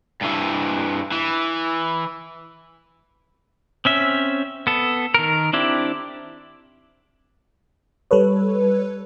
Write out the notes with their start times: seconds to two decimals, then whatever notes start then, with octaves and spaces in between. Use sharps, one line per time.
0.21 G2 E3
1.12 E3
3.85 C4 C#4 E5
4.67 B3 A4
5.14 D#3 A#4
5.53 C4 D4 E4 G4
8.11 G3 A4 B4 C#5